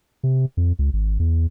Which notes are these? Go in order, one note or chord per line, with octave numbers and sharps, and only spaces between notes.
C3
F2
C#2
G#1
E2